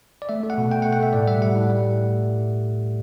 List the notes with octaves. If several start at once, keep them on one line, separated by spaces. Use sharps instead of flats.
D5
A3 E5
A3
F#5
B2
A3 G5
F#5
A3
F#5
A3 E5
A2 D5
G3 E5
G3 F#5
A2
G3